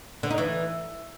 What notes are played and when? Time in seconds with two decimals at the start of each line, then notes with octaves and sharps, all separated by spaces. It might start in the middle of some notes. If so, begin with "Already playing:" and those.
0.23 D3
0.31 D#4
0.38 E3